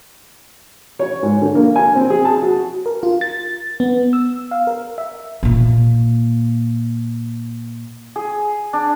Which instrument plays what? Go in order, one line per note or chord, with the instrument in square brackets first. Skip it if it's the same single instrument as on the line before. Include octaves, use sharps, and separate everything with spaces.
[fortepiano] C#5
G#2
D3
A#3
G#5
C4
G#4
A5
F#4
[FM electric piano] A#4
F4
A6
B3
E6
F5
A#4
E5
[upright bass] A#2 A#3
[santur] G#4
D4